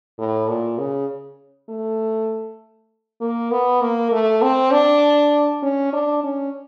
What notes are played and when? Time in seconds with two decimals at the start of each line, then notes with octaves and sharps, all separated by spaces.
0.18 A2
0.48 A#2
0.78 C#3
1.69 A3
3.21 A#3
3.51 B3
3.81 A#3
4.12 A3
4.42 C4
4.71 D4
5.63 C#4
5.93 D4
6.24 C#4